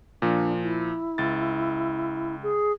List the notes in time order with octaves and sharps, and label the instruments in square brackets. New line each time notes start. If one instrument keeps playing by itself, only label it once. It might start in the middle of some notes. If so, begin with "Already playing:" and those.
[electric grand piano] A#2 F3 [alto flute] D4
[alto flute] E4
[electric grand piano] C#2 A6
[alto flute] G#4